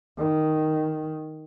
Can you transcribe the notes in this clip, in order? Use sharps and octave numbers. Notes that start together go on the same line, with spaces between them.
D#3